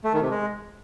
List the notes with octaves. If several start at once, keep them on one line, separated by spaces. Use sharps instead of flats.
A3
D#3
C3
G#3